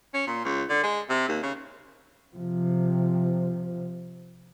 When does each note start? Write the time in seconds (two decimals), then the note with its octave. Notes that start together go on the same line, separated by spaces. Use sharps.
0.14 C#4
0.27 A#2
0.45 C#2
0.69 D3
0.83 G#3
1.10 C3
1.28 D#2
1.43 C#3
2.36 C3 F3